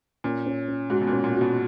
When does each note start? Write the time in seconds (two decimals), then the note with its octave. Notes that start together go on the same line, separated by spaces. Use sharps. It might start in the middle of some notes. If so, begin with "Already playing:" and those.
0.24 A#2 C#4
0.46 C#4
0.68 C#4
0.90 G#2 F#4
1.01 B2
1.07 A#2
1.13 C#4
1.24 A#2
1.34 F#4
1.41 B2